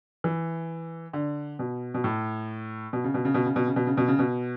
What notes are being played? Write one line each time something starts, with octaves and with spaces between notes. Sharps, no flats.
E3
D3
B2
B2
A2
B2
C#3
B2
C#3
B2
C#3
B2
C#3
B2
C#3
B2
C#3
B2